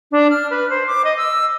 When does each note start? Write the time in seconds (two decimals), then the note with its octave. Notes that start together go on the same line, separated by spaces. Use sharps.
0.12 D4
0.30 F6
0.50 B4
0.70 C5
0.87 D6
1.05 D#5
1.17 E6